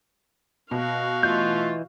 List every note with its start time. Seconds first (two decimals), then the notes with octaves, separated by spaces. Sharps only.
0.71 B2 F#4 F5
1.23 E3 A3 F4 D#5 G6